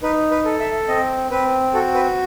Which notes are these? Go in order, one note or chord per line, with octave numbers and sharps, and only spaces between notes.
D#4 B4
B4
A4
E5
C4 D#5
C4 B4
F#4 A4
B4